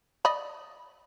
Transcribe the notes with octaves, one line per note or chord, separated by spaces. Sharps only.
D5 D#5 B5